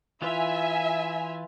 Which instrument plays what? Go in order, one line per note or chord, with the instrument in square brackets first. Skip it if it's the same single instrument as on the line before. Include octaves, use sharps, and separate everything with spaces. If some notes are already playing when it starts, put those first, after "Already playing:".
[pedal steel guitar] E3 F4 [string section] E5 G#5